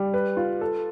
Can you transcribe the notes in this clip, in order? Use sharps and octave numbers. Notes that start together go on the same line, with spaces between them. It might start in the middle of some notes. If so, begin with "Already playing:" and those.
Already playing: G3
B4
F4
A4